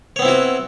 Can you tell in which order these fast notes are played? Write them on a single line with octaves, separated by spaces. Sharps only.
C#5 B3 C4 E4 F#4